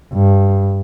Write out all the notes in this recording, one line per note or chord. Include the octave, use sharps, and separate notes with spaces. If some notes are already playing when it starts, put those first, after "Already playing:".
G2